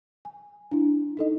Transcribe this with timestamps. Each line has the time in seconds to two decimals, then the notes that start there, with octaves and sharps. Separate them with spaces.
0.25 G#5
0.71 D4 E4
1.17 D#4 A4 D#5